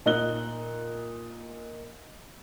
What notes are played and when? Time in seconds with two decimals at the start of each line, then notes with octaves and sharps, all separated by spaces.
0.06 A#2 D#4 F#6 G7